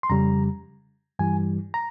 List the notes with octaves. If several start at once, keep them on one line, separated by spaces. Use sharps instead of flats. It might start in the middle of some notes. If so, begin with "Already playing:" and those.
C6
F2 C#3 G3 A#5
G2 E3 G3 G#5
A#5